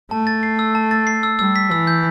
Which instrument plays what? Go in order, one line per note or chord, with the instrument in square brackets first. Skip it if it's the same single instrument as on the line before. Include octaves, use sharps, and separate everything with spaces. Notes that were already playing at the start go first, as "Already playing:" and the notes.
[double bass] A3 [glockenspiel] A5
[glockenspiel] A6
C7
E6
A5
A6
C7
E6
[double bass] G3 [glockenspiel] E6
[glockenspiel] B6
[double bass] E3 [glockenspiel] E6
[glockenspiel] G6